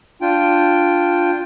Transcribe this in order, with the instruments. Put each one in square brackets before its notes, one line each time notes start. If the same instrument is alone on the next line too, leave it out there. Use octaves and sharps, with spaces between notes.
[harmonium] D4 F4 G5